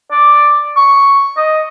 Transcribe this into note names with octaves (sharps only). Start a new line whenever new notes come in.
D5
C#6
D#5